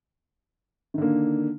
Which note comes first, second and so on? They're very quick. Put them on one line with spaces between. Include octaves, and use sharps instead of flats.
D#3 D3 A#3